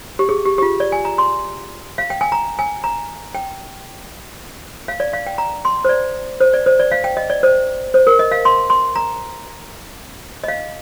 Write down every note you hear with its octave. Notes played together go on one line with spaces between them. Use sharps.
G4
G#4
G4
G4
F4
D5
G#5
A#5
C6
F5
G5
G#5
A#5
G#5
A#5
G5
F5
D5
F5
G5
A#5
C6
C5
D5
C5
D5
C5
D5
F5
G5
D#5
D5
C5
C5
A#4
D#5
F5
C6
C6
A#5
D#5
F5